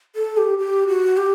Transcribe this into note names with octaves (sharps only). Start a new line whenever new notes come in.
A4
G4
G4
F#4
G4